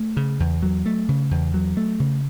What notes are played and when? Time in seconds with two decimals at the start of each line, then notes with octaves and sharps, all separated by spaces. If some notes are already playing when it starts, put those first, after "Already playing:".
Already playing: A3
0.17 C#3
0.40 E2
0.63 F#3
0.86 A3
1.09 C#3
1.31 E2
1.54 F#3
1.77 A3
2.00 C#3